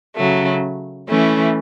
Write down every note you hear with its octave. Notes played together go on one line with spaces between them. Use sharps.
C#3 F#3 A3
E3 A3 C#4 E4